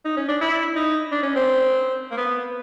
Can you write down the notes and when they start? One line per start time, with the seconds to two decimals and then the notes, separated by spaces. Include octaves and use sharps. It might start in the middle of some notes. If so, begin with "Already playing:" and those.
0.05 D#4
0.17 C#4
0.29 D4
0.41 E4
0.76 D#4
1.12 D4
1.23 C#4
1.35 C4
2.11 A#3
2.17 B3